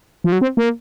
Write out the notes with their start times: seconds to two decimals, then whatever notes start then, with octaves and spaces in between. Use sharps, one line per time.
0.24 F3
0.32 F#3
0.41 C4
0.57 A#3